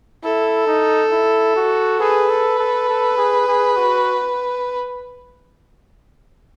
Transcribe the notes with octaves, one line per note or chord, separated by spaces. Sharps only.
E4 A4
D#4
E4
F#4
G#4 B4
A4
A4
A4
G#4
G#4
F#4